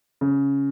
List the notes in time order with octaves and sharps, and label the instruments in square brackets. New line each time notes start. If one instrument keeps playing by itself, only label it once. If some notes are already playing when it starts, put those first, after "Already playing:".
[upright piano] C#3